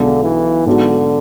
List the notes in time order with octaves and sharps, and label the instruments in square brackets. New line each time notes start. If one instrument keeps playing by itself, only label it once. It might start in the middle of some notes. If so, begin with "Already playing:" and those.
Already playing: [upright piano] B1 B2 G#3 [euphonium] D3
[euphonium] E3
[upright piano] G#2 F#3 B3 F#4 [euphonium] D3